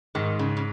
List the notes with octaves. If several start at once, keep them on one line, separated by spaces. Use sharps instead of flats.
G#2 D#3
C#3
C#3